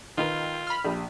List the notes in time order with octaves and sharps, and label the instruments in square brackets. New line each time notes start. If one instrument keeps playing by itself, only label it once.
[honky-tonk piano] D#3 [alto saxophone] F4 [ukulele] A#4 B4 D#5
[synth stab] B5 F6
[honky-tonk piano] A#1 [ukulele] G4